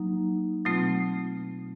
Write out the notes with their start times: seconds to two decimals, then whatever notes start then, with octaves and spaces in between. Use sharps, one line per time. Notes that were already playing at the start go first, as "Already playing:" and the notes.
Already playing: F#3 A#3 D#4
0.65 B2 F#3 A3 C4 F4